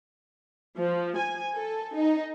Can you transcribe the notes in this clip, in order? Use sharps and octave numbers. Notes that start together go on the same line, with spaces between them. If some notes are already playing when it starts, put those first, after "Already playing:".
F3
G#5
A4
D#4